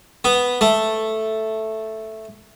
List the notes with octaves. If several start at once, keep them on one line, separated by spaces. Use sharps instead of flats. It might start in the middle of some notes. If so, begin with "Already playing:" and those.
B3
A3